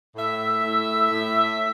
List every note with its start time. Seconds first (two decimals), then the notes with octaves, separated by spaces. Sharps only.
0.16 A2 E5
0.63 A2
1.10 A2
1.57 A2